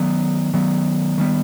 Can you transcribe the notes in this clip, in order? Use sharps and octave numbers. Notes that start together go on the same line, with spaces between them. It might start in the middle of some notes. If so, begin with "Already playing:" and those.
Already playing: D#3 F#3 B3
D#3 F#3 B3
D#3 G3 B3